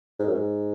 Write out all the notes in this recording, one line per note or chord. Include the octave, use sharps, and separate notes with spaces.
G#2
F#2
G#2